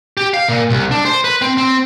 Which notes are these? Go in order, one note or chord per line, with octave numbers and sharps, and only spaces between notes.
G4
F5
A#2
C2
D4
C5
B4
C4
C4